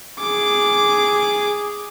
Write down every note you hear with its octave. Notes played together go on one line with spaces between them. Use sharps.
G#4 D6